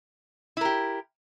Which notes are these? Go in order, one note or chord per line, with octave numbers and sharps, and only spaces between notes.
E4 G4 A#4